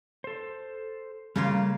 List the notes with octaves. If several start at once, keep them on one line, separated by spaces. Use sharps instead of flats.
A4 C5
C#3 G3 A3 A#3 F4 A#4